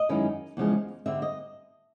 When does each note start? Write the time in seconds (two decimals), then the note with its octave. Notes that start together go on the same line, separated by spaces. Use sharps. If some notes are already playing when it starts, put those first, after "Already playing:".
Already playing: D#5
0.09 F#2 D#3 G#3 C#4 E4
0.57 E2 C#3 F3 G#3
1.06 D3 G3 C4 E5
1.22 D#5